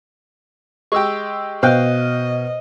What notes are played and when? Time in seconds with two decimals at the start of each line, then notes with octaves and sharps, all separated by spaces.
0.92 G#3 G4 C#6 E6
1.63 B2 C5 D#5 F5 G5 F6 F#6